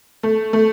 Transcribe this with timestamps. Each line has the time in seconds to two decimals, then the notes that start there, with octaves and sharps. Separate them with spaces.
0.23 A3
0.53 A3